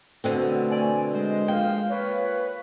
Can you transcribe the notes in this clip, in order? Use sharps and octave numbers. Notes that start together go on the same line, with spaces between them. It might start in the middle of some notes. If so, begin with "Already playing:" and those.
B2 D3 A3 C4
D5 G#5
G#3 C5 D#5
F3 A#3 F5 G5
A#3 F4 B4 C#5